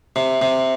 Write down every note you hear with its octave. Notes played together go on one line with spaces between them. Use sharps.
C3
C3